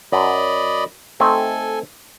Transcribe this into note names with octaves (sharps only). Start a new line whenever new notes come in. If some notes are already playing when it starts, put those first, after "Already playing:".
F#2 D5 D#5 B5
A3 C4 D#4 A4 G#5